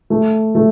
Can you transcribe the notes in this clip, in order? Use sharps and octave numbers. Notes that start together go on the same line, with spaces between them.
A3
A3